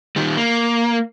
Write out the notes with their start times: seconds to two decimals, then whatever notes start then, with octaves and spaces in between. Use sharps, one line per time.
0.16 D#3 G3
0.37 A#3